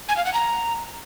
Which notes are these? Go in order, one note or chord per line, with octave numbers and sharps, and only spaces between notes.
G#5
F5
F#5
A#5